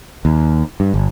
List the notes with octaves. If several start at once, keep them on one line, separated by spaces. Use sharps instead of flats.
D#2
G2
G1